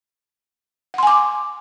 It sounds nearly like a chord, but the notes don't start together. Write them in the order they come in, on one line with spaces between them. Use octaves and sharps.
F#5 C6 G#5 D6